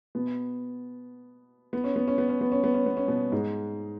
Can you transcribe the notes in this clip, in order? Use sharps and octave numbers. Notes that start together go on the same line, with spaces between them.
B2 B3
B3
C#4
B3
C#4
B3
C#4
B3
C#4
B3
C#4
B3
C#4
B2 B3
G#2 G#3